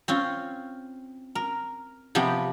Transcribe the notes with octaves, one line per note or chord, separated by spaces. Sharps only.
C4 C#4 F4
A#4
C3 F3 B3 G4